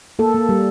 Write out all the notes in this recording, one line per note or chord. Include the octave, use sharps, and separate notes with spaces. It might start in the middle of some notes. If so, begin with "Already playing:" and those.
A#3 A4
A#3
G3